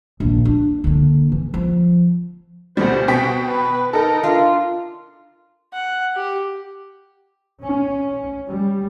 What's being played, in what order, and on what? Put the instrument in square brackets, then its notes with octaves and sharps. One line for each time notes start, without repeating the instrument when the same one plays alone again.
[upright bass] A#1 D#2
D4
D3 A#3
E3
F3
[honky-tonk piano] D2 B2 G3 [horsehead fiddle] C5 F#5
[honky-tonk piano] B2 G5 B6
[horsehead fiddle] B4
[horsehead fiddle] D#4 D#5 [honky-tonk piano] A4 A#4
[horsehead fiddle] D4 [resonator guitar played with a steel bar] F4
[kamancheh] F#5
G4
[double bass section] C#4
G3